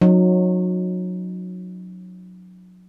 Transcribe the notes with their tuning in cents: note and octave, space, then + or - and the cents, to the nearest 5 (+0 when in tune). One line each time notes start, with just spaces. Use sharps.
F#3 -25 D#4 -15